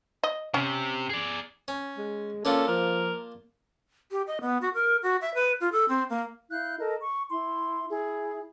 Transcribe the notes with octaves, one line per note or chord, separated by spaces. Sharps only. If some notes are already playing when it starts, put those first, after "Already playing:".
D#5
C3 C#4
G#4 D5
C#4
G#3
A#3 C#4 D4 F4 A4
F3 A#4
G4
D#5
B3
F#4
A#4
F#4
E5
B4
F4
A4
C4
A#3
E4 F5 F#6 G6
A4 A#4 D#5
C#6
E4 C6
E4 G#4